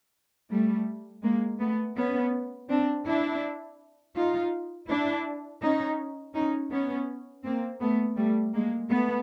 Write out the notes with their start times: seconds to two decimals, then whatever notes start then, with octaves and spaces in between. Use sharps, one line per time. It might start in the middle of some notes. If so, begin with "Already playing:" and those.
0.50 G3 A3
1.24 G#3 A#3
1.60 A3 B3
1.97 B3 C#4
2.69 C4 D4
3.06 D4 E4
4.16 D#4 F4
4.89 D4 E4
5.62 C#4 D#4
6.35 C#4 D#4
6.71 B3 C#4
7.44 A#3 C4
7.82 A3 B3
8.17 G3 A3
8.53 G#3 A#3
8.90 A3 B3